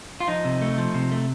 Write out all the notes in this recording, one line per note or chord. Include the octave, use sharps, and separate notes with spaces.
F4
F3 D#4
C3
A3
F3
C3
A3